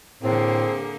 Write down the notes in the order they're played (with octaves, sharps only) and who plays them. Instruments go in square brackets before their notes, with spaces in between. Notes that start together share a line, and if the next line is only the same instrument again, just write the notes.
[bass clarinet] A2 [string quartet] D3 A#3 [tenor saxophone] C4 [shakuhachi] G#4